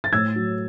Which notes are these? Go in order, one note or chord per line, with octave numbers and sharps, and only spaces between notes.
A6
A2 E6 G#6
F#3